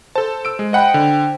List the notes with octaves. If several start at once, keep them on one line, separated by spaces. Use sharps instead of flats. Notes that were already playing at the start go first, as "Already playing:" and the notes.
A4 C5 A5
E6 D7
G#3
C5 D#5 F#5 G5 B5
D3